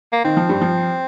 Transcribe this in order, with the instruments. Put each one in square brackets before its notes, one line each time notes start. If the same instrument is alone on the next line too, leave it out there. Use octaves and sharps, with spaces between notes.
[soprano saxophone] A#3
[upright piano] D#3 [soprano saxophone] C4
[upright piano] F3
G2 G3
F3